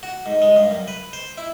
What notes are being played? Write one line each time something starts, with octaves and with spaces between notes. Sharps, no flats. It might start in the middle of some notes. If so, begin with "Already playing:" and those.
F#4
G#2
G#3
G2
F#2
B4
C5
E4